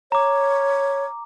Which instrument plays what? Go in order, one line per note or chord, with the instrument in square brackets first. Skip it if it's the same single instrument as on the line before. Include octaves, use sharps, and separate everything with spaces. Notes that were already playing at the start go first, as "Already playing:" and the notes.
[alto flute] C#5 [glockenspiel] A#5 D6